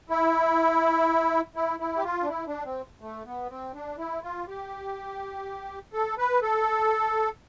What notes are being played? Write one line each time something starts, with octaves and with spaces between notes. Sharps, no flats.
E4
E4
E4
G4
F4
D4
E4
D4
C4
A3
B3
C4
D4
E4
F4
G4
A4
B4
A4